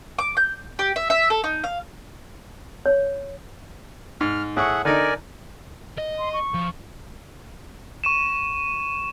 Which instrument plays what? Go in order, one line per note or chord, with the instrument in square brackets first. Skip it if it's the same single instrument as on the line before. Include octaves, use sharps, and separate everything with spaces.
[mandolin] D6
G6
G4
E5
E5
A4
D#4
F5
[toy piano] C#5
[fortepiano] G#2 [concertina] F6
[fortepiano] A2 C#6 [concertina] G#4 E5 F#5
[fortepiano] D3 D#4 [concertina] A#4 D5 G#5
[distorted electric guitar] D#5
[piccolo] C6
C#6
[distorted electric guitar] F3
[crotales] C#6 D#7 E7